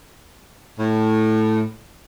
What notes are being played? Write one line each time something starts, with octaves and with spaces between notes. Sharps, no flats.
A2